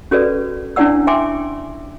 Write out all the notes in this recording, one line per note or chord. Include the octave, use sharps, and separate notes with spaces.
C#4 F#4 A4 B4 D5
C#4 D4 E4 D5 F#5 E6
E5 G5 G#5 C6 D6